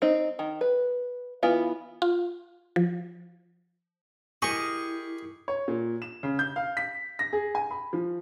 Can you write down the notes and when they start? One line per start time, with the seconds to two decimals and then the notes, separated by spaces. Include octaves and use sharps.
0.02 C4 D#4
0.39 D#3
0.61 B4
1.43 E3 B3 E4 F4
2.02 F4
2.76 F3
4.42 E4 G4 G#4 A#4 D#5 G#5 C#6
5.48 C#5
5.68 A#2
6.02 E7
6.23 C#3
6.39 G6
6.56 F5
6.77 B6
7.19 A#6
7.33 G#4
7.55 G#5
7.70 B5
7.93 F3